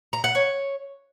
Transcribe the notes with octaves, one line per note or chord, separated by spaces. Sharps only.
A#5
F#5
C#5